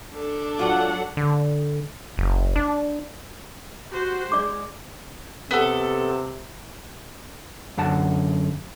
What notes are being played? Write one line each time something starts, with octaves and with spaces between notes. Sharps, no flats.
D4 A4
F#3 F4 F#4 D5 F#5
D3
F#1
D4
F#4 G4 C5
G#3 D5 D6
C3 B3 A4
F#2 D3 F#5 A5